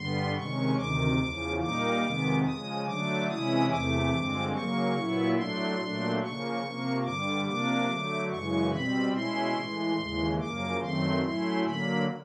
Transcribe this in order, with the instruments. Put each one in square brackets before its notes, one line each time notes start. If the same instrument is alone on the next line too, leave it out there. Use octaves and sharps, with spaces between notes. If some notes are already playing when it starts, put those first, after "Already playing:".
Already playing: [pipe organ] G2 D3 G3 B3 C6
C3 D#3 G#3 C#4 C#6
D2 C3 D#3 D6
E2 C#3 F3
A#2 G3 A#3 D#4 D6
F2 C3 D#3 G#3 B3
C#3 F3 G#3 D#6
D3 F#3 A3 D4 D6
C3 E3 G#3 C#4 E4 D#6
E2 C3 E3 A3 D6
G2 D3 F3 G#3 C4
C#3 F#3 A#3 C#6
A#2 F#3 B3 E4
A2 F#3 A3 D4 C6
A#2 F#3 A3 D4
C#3 F3 A#3 C#6
C3 F3 A#3
G2 D3 G3 D6
C3 F3 A#3 D4 D6
D3 F#3 A3
F#2 C#3 E3 G#3 C#6
B2 G3 C4 B5
B2 G#3 C#4 E4 C6
A2 E3 G#3
D#2 C#3 E3 G#3
F#2 C#3 F3 A#3 D6
F#2 D#3 F#3 A3 C4 C6
A2 F#3 A3 C#4 E4 C6
D3 F#3 A#3 B5